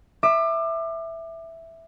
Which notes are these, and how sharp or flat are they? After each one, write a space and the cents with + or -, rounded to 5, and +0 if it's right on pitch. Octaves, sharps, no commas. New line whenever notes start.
E5 +0 D6 +30